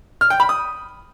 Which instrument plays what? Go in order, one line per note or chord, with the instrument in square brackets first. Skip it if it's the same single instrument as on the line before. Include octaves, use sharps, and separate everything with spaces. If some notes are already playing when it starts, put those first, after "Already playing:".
[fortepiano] F6
G5
B5
D#6